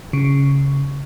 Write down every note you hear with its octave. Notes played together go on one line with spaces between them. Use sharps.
C#3